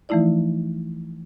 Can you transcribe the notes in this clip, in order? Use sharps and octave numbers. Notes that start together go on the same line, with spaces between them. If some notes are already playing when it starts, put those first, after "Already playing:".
E3 F3 A3 D#4 E4 D5